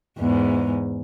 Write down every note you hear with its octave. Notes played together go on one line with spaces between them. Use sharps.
E2 G#2